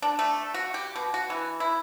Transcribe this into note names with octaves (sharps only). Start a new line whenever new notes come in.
D4
A3
F#4
G4
B2
F#4
E3
E4